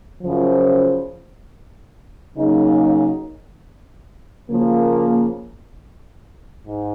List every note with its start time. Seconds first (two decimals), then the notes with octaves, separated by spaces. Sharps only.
0.22 F#2 C#3 F3
2.35 C#3 F#3 A#3 D#4 G#4
4.50 C#3 F3 A#3
6.64 G#2